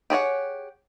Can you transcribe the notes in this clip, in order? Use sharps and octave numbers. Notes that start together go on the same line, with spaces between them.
G4 G#4 C#5 F#5